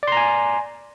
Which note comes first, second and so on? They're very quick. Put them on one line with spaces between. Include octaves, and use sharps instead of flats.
D5 C6 A#5 G#5